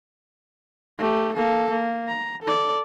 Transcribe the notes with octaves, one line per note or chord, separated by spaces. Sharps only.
A3 G4
A#3 A4
A#3
A#5
A4 D5